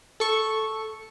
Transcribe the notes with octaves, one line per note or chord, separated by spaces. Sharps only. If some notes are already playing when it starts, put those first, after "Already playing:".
A4 C#6